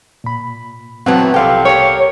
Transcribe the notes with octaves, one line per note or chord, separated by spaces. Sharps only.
A#2 B5
E3 F#3 A3 B3 C4 F#4
C2 F3 C4 G4 A4 F5 G5
G4 A#4 C#5